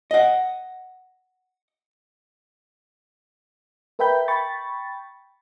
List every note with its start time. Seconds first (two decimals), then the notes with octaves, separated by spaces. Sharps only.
0.11 D#5 F#5
3.99 A#4 B4 E5 G5 B5 G6
4.28 G5 B5 C#6 A6